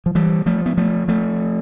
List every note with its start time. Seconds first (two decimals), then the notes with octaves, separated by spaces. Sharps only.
0.06 F3
0.15 E3 G3
0.46 F3 A3
0.66 B3
0.77 F3 A3
1.08 F3 A3